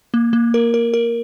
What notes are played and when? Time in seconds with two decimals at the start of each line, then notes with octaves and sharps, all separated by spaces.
0.14 A#3
0.33 A#3
0.54 A#4
0.74 A#4
0.94 A#4